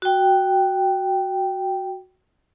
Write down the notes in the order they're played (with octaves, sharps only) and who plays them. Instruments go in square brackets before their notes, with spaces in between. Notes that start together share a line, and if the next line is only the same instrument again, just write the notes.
[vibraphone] F#4 G5